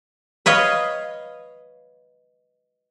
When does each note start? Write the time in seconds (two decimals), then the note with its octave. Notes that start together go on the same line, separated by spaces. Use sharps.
0.46 B4 C#5 D#5 F5